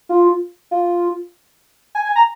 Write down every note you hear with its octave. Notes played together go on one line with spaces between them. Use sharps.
F4
F4
G#5
G#5
A#5